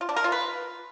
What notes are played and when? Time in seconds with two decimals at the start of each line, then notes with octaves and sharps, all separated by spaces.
0.01 F4
0.09 D4
0.16 A#4
0.24 F4
0.32 B4